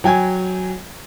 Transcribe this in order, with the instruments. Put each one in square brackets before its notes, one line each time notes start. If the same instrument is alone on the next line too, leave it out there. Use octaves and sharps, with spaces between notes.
[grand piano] F#3 G5 G#5 G#6